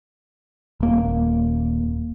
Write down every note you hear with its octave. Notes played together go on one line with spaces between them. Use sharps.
D#1 A#3